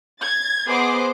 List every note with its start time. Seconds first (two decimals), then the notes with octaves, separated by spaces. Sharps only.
0.21 G#6 A6
0.68 B3 G#4 C5 D#5 D6 C7